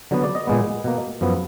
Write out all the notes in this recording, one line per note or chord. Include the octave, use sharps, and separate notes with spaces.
D3 F#3 B3
D5
D#5
A#2 G#3 B3
B2 A#3
F#2 F3 B3